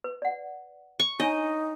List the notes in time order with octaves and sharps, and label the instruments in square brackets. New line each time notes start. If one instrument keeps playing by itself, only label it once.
[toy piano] B4
D5 F#5
[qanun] C#6
[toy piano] D4 C#5 G#5 [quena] D#4 [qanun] D#5